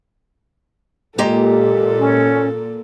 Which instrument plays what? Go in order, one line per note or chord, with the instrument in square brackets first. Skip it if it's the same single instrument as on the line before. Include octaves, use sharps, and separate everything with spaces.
[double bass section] A#2 [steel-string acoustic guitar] G#3 G4 A#5 [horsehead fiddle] A4
[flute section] C#4